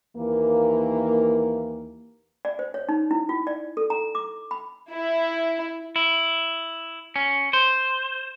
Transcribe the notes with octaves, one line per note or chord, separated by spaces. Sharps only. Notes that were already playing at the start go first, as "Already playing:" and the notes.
D#2 E3 A#3
D5
C5
C#5
D#4
E4
F4
D5
A4
A#5
D6
B5
E4
E4
C#4
C5